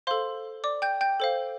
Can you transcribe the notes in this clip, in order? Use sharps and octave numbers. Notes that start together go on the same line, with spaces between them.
A4 C5 F5 C6
D5 D6
G5 G6
G5 G6
A4 C5 F5